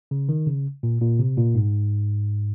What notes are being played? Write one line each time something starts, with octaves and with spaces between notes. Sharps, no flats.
C#3
D#3
C#3
A#2
A#2
C3
A#2
G#2